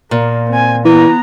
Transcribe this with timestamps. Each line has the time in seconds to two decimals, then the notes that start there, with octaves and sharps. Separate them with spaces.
0.11 A#2 A#3
0.51 C4 G#5
0.85 E3 B3 A#5